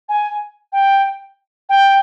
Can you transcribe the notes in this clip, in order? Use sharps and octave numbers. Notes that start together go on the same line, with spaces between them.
G#5
G5
G5